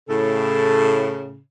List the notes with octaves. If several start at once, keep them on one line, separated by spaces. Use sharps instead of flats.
A2 C#3 A4